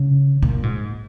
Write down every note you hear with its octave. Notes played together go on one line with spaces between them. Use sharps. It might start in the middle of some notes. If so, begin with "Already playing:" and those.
Already playing: C#3
A#2
G#2